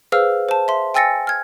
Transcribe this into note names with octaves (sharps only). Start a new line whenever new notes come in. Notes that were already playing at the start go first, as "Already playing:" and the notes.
G#4 B4 C5 F5 E6 F6
C5 A5
E5 C6
G5 G#5 E6 A6 A#6 C#7
F6 G#6